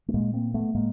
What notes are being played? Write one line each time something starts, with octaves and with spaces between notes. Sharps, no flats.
A3
A#2 G#3 A#3
A#3 C4
A3 B3
A2 G#3 A#3